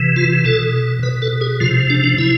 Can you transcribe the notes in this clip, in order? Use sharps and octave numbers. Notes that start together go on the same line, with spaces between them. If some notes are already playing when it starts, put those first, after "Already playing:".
Already playing: C3 E3
F4
B2 A4
B2 B4
A4
G#4
C3 F3 F4
D4
D4
C3 F3 E4